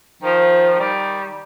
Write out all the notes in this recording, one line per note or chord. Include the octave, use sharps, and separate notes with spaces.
D#3 F3
D#3 G3